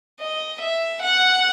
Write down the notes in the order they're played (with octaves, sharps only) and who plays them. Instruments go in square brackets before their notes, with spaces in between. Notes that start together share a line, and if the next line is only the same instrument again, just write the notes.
[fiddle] D#5
E5
F#5